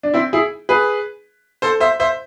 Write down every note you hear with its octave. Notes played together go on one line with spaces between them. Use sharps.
D4
C4 E4
E4 G#4
G#4 B4
A4 C5
C5 E5
C5 E5